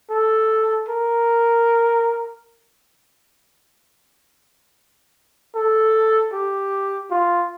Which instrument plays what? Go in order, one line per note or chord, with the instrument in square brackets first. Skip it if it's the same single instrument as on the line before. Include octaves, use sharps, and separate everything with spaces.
[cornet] A4
A#4
A4
G4
F4